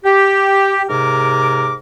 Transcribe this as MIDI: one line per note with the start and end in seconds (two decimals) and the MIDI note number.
0.04 0.83 67
0.89 1.74 44
0.89 1.74 48
0.89 1.74 70
0.89 1.74 86